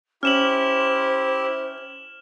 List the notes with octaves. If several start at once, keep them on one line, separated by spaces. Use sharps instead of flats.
C#4 E4 G4 C5 F6 E7 F#7